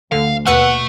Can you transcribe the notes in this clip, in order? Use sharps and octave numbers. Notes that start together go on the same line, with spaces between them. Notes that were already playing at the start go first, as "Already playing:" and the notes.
D2 D3 F5
D#2 B2 A3 B4 F#5 E6